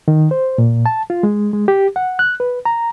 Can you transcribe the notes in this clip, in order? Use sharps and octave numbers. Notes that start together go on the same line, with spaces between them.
D#3
C5
A#2
A5
F4
G#3
G#3
G4
F#5
F#6
B4
A#5